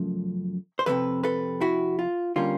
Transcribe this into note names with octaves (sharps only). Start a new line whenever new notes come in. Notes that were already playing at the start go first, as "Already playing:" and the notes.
Already playing: F#2 C#3 F3 A3
C5
F2 C3 D#3 F#3 A4 B4
A4 B4
E4 F#4
F4
D3 G3 A#3 C#4 F4